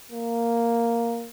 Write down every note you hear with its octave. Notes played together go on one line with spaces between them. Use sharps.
A#3